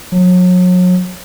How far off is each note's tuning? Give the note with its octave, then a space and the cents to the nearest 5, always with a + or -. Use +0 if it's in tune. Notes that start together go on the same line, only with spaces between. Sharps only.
F#3 -35